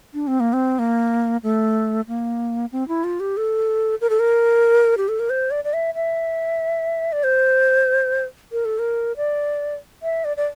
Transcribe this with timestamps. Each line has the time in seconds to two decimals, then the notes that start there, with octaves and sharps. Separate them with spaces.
0.14 D4
0.27 C4
0.40 A#3
0.53 C4
0.79 A#3
1.43 A3
2.08 A#3
2.72 C4
2.88 E4
3.04 F4
3.20 G4
3.37 A4
4.01 A#4
4.10 A4
4.20 A#4
4.97 G4
5.08 A4
5.20 A#4
5.30 C5
5.51 D5
5.64 D5
5.73 E5
5.95 E5
7.12 D5
7.24 C5
8.52 A#4
8.65 A4
8.79 A#4
9.17 D5
10.03 E5
10.25 D5
10.37 D5